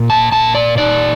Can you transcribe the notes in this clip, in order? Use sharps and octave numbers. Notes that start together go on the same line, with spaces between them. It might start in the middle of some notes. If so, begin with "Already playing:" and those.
Already playing: A#2
A5
A#2 A5
D5
D#4 D5